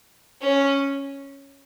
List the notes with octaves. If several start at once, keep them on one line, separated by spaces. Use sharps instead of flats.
C#4